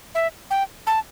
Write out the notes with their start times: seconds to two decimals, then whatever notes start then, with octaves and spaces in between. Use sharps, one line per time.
0.15 E5
0.51 G5
0.87 A5